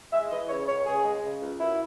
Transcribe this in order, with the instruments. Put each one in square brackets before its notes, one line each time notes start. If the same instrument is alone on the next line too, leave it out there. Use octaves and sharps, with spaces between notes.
[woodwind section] G#3 E5
E3 D#5
C#3 C#5
C#2 C#5
C#2 G#4
G#3
C#3
C#2
F#2 E4